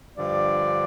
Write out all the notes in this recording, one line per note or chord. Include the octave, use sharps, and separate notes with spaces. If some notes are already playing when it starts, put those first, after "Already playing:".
G2 D3 F3 D5